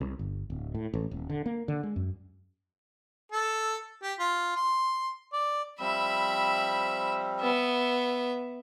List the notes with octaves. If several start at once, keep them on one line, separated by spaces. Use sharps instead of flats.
C2
G1
D1
A2
A1
D#1
D3
A#3
D3
G#3
F#2
A4
G4
F4
C6
D5
F3 G3 C4 E5 B5
B3 E5